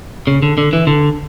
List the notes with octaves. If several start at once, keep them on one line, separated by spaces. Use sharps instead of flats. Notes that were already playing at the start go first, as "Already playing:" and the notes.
C#3
D3
D3
E3
D3